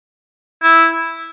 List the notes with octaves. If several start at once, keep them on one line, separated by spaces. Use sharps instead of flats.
E4